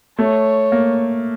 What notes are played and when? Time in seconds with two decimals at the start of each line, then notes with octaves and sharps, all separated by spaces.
0.18 A3 C#5
0.72 A#3